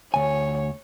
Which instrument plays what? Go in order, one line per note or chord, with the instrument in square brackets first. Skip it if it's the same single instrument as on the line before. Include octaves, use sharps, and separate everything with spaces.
[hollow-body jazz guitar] D2 G#5 [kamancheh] C#5